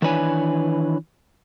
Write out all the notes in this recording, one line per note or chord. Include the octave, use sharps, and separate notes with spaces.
D#3 E3 D4 B4 C#5 G#5